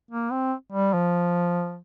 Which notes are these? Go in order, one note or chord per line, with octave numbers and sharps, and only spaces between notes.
A#3
C4
G3
F3